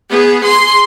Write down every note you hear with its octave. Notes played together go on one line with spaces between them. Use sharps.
B3 G#4
G#4 C6